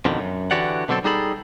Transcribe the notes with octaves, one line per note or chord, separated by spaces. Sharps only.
F2 B2 D3 D#3
F#2
D3 E3 F#4 G4 D5 F#5
B2 D3 F#3 C4 A4
G3 D#4 G#4 A4 B5